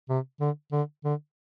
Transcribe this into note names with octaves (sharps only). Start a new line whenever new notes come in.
C3
D3
D3
D3